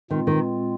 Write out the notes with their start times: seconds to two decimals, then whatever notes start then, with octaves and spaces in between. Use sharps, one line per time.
0.11 A#2 D#3 G#3 C4 F4
0.27 D#3